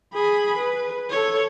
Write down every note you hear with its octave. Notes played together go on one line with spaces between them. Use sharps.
G#4 B5
B4
A4 C#5